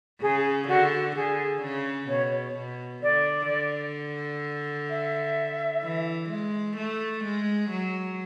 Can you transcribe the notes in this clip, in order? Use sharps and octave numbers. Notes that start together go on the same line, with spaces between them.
C#3 G#4
D3 F#4
D3 G#4
C#3
B2 C#5
B2
D3 D5
D3
E5
E3
G#3
A3
G#3
F#3